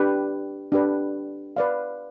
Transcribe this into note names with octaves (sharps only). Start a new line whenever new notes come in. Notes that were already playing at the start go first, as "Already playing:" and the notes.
Already playing: D4 G4 B4
D4 G4 B4
B4 D5 F5